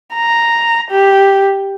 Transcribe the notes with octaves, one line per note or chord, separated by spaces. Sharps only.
A#5
G4